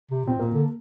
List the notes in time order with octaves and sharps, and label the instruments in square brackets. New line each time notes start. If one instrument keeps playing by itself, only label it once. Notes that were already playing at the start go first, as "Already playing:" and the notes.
[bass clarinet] C3
[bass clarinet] A#2 [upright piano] C4
[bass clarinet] A#2 [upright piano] A#3
[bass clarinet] D3